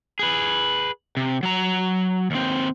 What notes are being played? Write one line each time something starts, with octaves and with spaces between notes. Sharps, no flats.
G#4 B4
C3
F#3 A#5
D#2 C4